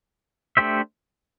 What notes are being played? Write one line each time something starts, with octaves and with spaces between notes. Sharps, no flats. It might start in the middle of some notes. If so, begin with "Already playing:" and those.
A3 D4 G4 C5 E5